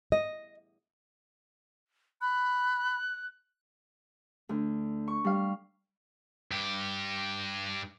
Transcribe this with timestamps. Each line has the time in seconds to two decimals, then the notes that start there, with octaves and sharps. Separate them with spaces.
0.12 D#5
2.21 B5 F#6
4.49 D2
5.08 C#6
5.24 G3 F5
6.51 G2 G4